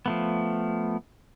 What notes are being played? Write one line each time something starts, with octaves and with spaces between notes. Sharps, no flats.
F3 A3 B3